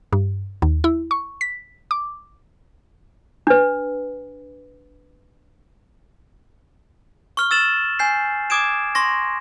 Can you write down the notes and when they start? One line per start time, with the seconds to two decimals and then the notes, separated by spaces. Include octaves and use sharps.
0.13 G2
0.62 D#2
0.84 E4
1.11 C#6
1.41 B6
1.91 D6
3.47 D4 B4
7.37 C#6 F6 G7
7.51 E6 A6 E7 F#7
7.99 G#5 G6 C7
8.50 D6 D#6 G#6 D7 E7
8.95 C6 C#6 A#6